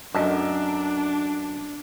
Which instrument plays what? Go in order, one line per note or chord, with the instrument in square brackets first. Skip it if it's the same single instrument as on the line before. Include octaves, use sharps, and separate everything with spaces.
[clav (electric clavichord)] F#2 [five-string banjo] A3 D#5 A5 [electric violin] D4